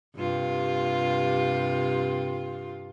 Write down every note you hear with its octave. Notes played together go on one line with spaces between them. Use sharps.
G2 C3 F4